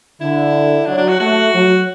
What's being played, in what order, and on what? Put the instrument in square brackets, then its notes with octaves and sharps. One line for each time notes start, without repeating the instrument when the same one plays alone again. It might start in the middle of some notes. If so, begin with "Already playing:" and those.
[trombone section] D3 [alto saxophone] E4
[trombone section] F#3 [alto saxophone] D4
[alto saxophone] D4
F#4
[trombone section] A3 [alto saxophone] F#4
[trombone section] F#3